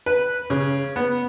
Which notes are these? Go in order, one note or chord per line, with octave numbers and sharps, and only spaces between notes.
B4
C#3
B3